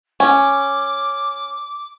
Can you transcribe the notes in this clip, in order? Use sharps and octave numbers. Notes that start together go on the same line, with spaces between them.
C#4 D6